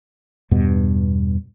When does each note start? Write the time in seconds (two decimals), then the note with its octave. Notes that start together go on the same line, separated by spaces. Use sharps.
0.51 E2 G2 B2 B3